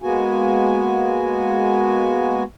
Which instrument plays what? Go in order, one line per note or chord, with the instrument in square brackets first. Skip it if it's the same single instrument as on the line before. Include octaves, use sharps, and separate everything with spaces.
[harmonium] G#3 A#3 B3 F#4 G#5